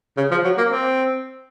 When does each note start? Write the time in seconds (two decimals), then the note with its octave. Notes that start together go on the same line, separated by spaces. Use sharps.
0.17 C#3
0.31 F3
0.44 F#3
0.57 A#3
0.71 C4